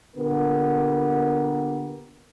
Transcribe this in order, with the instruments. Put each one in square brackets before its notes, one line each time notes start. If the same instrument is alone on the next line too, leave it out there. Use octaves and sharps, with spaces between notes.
[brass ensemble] A#2 D3 B3 G4 A#4